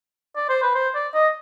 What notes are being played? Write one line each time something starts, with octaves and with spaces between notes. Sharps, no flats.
D5
C5
B4
C5
D5
D#5